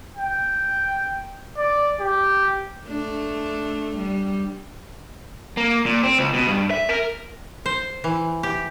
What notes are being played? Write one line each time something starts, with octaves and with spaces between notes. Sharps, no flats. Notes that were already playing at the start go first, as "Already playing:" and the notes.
G5
D5
G4
A3 D4
G3
A#3
A#2
C4
C#2
B2
G2
E5
A#4
C5
E3
G4